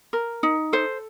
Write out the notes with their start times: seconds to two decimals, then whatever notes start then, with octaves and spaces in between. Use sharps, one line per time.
0.13 A#4
0.43 D#4
0.73 A4 C5